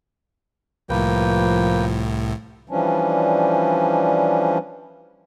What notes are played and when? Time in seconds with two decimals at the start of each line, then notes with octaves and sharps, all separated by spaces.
0.89 C2 A2 F3 A#3 B4 G5
2.69 E3 F3 G3 C#4 D4